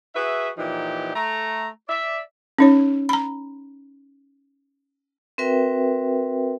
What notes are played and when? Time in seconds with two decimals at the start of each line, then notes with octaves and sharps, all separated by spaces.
0.15 F#4 G#4 B4 E5
0.57 A#2 E3 F3 D#4 G4
1.15 A3 A#5
1.89 D5 E5
2.59 C#4 D#4 C#5
3.09 A#5 B5
5.38 C4 F#4 A#4 B4 E5 G5